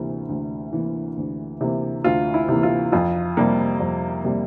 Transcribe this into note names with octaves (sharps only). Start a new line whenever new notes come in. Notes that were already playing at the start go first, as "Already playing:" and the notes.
Already playing: D2 C3 E3 A#3
D2
C3 E3 A#3
D2
C3 E3 A#3
D2 F4
E4
C3 E3 A#3
F4
F2 F4
C3 G3 A#3
F2
C3 G3 A#3